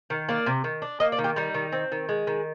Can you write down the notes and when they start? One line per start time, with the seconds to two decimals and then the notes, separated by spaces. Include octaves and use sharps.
0.10 D#3
0.29 A#3 D5
0.46 C3
0.64 D#3
0.82 D4
1.00 A#3 D#5
1.12 D5
1.19 D#3
1.24 G4
1.36 G3 D#4
1.54 D#3
1.72 C4
1.92 D#3
2.09 G#3
2.27 D#3